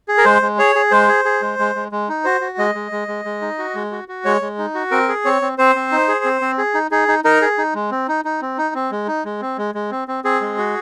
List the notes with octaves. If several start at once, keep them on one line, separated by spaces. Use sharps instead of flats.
G#4
A#4
G#3 C5
G#3
G#4 C#5
G#4
G#3 C5
G#4
G#4
G#3
G#3
G#3
G#3
D#4
F#4 C5
F#4
G#3 D#5
G#3
G#3
G#3
G#3
D#4
F#4
G#3
F#4
F#4
G#3 C#5
G#3
D#4
F#4
C4 A#4
G#4
C4 C#5
C4
C4 C5
C4
D#4
G#4
C4
C4
G#4
D#4
D#4 G#4
D#4
D#4 A#4
G#4
D#4
G#3
C4
D#4
D#4
C4
D#4
C4
G#3
D#4
G#3
C4
G#3
G#3
C4
C4
C4 G#4
G#3
F#4